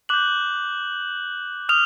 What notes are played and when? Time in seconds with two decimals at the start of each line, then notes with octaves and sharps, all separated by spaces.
0.09 D6 F#6 G6 F#7
1.69 D#6 F6 F7